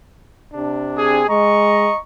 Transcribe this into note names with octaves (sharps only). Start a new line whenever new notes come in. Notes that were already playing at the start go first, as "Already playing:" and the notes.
C3 D4
C4 G#4
G#3 D#5 A#5 C#6